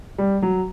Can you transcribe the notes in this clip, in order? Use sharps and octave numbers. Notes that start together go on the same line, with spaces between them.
G3
F#3